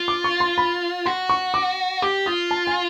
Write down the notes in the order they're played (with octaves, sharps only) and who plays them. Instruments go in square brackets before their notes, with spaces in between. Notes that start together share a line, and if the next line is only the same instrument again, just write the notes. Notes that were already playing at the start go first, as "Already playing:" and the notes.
Already playing: [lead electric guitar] F4
[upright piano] D6
C#6
C6
B5
[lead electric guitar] F#4 [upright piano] C6
[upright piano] C#6
D6
[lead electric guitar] G4 [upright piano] D6
[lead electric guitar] F4 [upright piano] D#6
[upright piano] A5
G#5